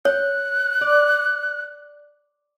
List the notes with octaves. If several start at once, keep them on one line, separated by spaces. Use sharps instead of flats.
C#5 F#6
D5